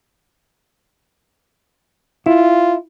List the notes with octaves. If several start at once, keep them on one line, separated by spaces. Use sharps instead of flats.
E4 F4